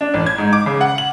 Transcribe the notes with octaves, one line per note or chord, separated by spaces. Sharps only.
D4
A1
G#6
G#2
D6
C#3
F#5
F#7